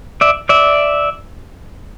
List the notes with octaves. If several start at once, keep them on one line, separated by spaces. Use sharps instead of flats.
D5 E5
D5 E5